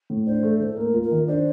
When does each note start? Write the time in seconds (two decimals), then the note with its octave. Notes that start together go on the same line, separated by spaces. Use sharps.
0.10 A2
0.26 D4 C5
0.43 A3
0.60 A2
0.66 A4
0.77 A#3 A#4
0.94 F4
1.02 A#4
1.11 D#3
1.27 D4 C5